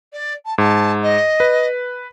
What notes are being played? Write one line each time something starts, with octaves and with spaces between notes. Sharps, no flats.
D5
A5
G#2 A5
D#5
B4